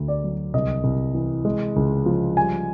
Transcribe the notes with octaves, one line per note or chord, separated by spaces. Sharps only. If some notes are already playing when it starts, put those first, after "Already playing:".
Already playing: D2 A3
D5
F#3
C2 D#5
C2
E3
G#3
C#2
F3
G3 G#5